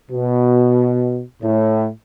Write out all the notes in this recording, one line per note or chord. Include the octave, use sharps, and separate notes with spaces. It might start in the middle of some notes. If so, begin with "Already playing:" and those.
B2
A2